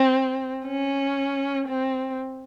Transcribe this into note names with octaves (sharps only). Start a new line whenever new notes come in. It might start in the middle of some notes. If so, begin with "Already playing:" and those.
Already playing: C4
C#4
C4